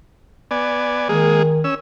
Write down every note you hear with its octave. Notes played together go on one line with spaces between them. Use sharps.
B3 D5 G#5
D#3 G#3 A#3 G#4
C#4 E6